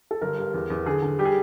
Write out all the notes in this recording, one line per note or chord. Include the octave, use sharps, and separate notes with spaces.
A4
G1 A#4
G2
E2
E2
D3 G#4
D3
G3 G4
G#4